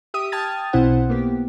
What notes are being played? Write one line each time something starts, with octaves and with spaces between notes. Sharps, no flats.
G4 E5 D#6 D#7
G5 A5 D#6 F6 G#6 A6
B1 B2 C4 E4 C5 F#5
A#3 B3 G4